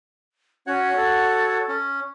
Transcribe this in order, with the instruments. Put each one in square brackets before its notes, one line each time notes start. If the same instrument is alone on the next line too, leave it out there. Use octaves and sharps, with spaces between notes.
[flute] C#4 [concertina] F#4 C#5 F#5
[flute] A4
[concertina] C#4